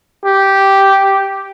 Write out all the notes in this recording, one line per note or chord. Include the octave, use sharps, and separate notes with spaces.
G4